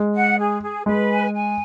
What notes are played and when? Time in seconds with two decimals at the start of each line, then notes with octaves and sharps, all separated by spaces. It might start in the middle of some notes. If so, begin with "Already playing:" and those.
Already playing: G#3
0.15 F#5
0.38 G#4
0.62 G#4
0.85 G#3 B4
1.09 G#5
1.33 G#5